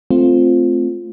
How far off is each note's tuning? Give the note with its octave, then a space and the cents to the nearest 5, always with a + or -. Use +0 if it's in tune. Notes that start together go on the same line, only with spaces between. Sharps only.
A3 +0 C4 +0 F4 +0